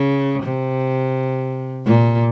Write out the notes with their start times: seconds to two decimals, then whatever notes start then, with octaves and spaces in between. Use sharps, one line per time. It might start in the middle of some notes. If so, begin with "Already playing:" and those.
Already playing: C#3
0.43 C3
1.86 A#2